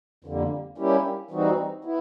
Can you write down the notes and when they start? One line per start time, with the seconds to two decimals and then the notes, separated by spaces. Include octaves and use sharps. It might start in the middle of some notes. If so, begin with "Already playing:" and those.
0.25 F2 D3 G3 A#3
0.78 G3 A#3 C#4 E4 G4
1.31 E3 G3 C4 D#4 F#4
1.85 B3 E4